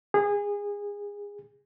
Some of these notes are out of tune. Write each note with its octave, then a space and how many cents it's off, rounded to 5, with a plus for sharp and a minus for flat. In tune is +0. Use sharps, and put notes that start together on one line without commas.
G#4 -25